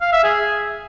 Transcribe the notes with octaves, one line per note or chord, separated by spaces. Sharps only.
F5
E5
G#4